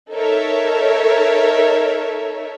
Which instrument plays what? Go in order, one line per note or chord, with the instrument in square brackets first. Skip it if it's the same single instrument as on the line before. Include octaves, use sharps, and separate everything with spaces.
[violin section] D#4 A4 A#4 C#5 E5